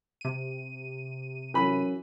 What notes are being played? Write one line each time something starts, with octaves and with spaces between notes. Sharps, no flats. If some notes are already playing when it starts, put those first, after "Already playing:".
C3 D#7
F#2 E3 B5